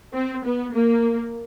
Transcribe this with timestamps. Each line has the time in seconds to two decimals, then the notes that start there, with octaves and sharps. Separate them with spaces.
0.13 C4
0.45 B3
0.74 A#3